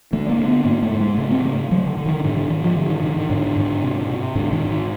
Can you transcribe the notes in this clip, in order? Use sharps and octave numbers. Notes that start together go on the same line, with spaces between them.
D3 A3
A#3
D3
B3
G#2 A#3
A3
G#2
G#3
C#3 A3
C4
C#3 A3
D3 F#3
D3
D#3
G#2 D3
D3
G#2 D#3
F3
D3
D#3
D3 D#3
D#3
G#2 D3
G#2
C3
C3
G#2 D3
D#3
G#2
D#3